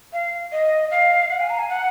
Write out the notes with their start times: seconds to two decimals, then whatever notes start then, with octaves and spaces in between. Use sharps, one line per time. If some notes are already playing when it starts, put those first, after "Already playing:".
0.13 F5
0.52 D#5
0.91 F5
1.30 F#5
1.40 G#5
1.50 A#5
1.59 G#5
1.69 F#5